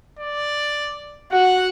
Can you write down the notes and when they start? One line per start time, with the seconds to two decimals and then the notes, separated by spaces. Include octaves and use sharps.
0.19 D5
1.32 F#4 F#5